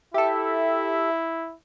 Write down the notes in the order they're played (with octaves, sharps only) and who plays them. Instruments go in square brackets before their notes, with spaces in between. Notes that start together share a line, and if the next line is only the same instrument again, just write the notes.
[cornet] E4 [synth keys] G4 A4 [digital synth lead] E5